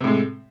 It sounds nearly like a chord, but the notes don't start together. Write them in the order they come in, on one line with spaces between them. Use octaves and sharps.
C3 A2 G#3